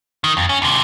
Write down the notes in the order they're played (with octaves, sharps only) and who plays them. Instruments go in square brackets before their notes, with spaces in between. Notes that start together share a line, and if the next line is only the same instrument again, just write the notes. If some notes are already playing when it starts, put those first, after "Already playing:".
[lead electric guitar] D#3
F2
C#4
D#2 C3